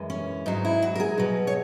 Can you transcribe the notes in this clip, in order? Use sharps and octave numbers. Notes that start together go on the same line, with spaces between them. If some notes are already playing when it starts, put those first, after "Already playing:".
Already playing: F#2 E3 G#3
C#4
G#2 F#3 D#4
E4
F#4
A#4
G#4
B2 F#3
C#5